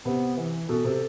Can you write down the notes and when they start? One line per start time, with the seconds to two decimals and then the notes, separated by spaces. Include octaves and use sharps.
0.05 C3 B3
0.38 E3
0.69 B2 A4
0.85 C3